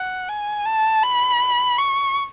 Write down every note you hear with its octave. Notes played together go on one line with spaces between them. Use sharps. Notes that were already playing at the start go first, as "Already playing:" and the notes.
Already playing: F#5
G#5
A5
B5
C#6